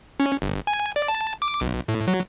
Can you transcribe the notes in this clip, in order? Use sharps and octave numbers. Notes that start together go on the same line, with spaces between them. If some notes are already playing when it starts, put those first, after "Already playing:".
C#4
G1
G#5
D5
A5
D6
B1
A2
F#3